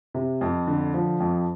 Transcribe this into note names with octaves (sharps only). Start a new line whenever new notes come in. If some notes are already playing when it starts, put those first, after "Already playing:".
C3
F2
D3
F3
F2